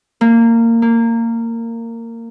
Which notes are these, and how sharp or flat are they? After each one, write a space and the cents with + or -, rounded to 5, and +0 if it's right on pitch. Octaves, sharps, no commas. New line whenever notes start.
A#3 -20
A#3 -20